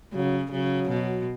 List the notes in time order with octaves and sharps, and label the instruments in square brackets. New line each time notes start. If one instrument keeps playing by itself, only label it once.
[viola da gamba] C#3 [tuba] F#3
[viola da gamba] C#3 [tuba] F#3
[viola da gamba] B2